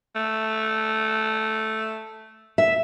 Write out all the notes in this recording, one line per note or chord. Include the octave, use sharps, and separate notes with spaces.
A3
E5